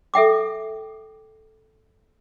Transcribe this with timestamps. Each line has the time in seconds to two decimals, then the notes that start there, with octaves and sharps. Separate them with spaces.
0.14 A4 E5 G5 D6